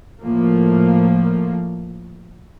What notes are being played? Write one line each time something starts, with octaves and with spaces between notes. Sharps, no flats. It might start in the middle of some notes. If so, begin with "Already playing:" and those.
A2 F3 A#3